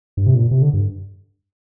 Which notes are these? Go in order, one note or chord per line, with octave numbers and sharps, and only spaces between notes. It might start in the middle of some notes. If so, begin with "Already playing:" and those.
G2
C3
A#2
C3
D3
G2